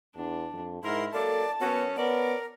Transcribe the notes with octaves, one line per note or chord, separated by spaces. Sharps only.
E2 D4
F2
G#2 E4 A#4 C6
F#3 A#3 A4 D5 A5
F#2 B3 C#4 F#4
B3 C#4 A#4 D5